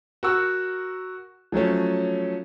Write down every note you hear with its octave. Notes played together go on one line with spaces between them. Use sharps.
F#4 A#4 F#5 C#6 E6
F3 F#3 A3 C#4